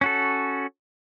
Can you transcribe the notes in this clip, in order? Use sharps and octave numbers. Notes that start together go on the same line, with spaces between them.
C#4 F#4 A4